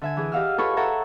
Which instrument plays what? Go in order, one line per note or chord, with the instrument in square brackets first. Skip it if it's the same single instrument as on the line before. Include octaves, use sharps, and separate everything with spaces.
[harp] D3 E5 G#5
E3 G#4
G4 D#5 F5 F#5 E6 F6
F4 A4 B4 C#5 B5 C#6
A4 C#5 E5 F#5 A#5